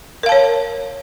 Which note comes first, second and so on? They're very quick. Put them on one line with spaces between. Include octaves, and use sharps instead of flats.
A#4 F5 A5 C#5